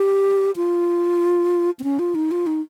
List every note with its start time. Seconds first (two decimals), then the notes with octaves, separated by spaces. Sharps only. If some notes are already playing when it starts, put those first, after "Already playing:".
Already playing: G4
0.56 F4
1.79 C4
1.84 C#4
1.99 F4
2.15 D#4
2.31 F4
2.47 D#4